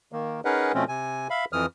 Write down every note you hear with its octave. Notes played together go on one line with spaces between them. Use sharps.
D#3 A#3
C#4 D#4 G#4 A#4 B4 F#5
B2 F3 A3 C4 C#4
C3 G#5
E5 F5 B5
F2 E3 D#6 F6